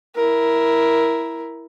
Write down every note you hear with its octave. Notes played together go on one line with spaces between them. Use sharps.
E4 A#4